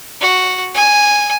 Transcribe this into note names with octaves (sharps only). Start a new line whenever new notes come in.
F#4
G#5